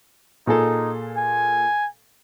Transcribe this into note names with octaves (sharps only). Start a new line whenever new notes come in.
A#2 D#4 G#4 A4
G#5